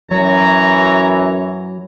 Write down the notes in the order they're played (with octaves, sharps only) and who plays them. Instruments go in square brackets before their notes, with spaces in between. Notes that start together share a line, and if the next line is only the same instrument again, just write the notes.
[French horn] F#2 [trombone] E3 [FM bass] F#3 [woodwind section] C#5 A#5